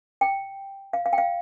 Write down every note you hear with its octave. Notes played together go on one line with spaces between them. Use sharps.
G5
F5
F5
G5
F5